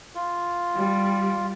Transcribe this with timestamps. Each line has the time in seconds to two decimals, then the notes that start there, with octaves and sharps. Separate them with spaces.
0.15 F4
0.75 G3